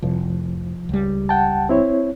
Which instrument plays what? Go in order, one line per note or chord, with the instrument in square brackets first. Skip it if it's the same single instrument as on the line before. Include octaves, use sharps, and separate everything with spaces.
[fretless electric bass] F1 [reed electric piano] C2 F3
[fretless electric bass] C#2 G3
[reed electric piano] F#5 G5 A5
C4 E4 C#5